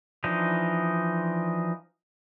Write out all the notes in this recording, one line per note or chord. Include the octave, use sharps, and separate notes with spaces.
E3 F3 D4 D#4